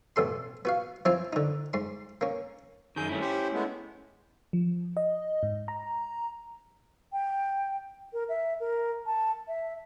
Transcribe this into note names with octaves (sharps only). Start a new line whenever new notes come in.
A1 B2 A4 C6
B3 F#4 F5
F3 C4 E4 F4 G#5
D3 D#4
G#2 C6
A#3 C#4
F#2 D#3 G#4 G6
G2 A3 C#4 E4
G4 C5
G#3 A3 B3
F3
D#5
G#2
A#5
G5
A#4
E5
A#4
A5
E5